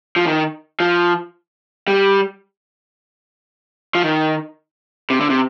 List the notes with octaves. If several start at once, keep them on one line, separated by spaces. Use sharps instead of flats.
F3
D#3
F3
G3
F3
D#3
C3
D3
C3